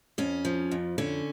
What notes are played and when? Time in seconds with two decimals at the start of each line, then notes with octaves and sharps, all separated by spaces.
0.18 F2 C#4
0.45 F3
0.71 F2
0.98 D3 C#4